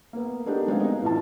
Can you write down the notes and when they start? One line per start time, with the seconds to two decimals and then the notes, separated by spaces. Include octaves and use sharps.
0.13 A#3 B3
0.46 A3 B3 D4 D#4 G4 A#4
0.67 F#3 G#3 B3 C4 D#4 F5
0.80 D#4 D#5
1.02 A2 E3 F4 A5